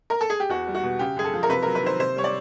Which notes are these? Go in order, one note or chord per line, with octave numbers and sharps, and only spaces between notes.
A#4
A4
G#4
G4
E2 F#4
G3
F#4
B2
C#3 G4
F#2 G#4
A4
F3
A#4
C3 B4
F#3 A#4
B4
D#3 C5
C3 C5
G3 C#5
D5